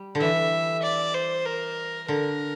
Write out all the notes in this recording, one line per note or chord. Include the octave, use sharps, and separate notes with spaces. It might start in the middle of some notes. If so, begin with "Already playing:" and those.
Already playing: G3
D3
E3 E5
D5
C5
A#4
D3 A#4